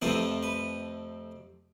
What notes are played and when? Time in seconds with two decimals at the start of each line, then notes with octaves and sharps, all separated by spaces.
0.02 F2 C3 F3 A3 C4 B4
0.43 B4